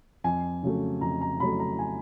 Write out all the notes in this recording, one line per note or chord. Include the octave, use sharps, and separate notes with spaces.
F2 G#5
C#3 F#3 A3
F2 A#5
A#5
C#3 F#3 A3 B5
A#5
G#5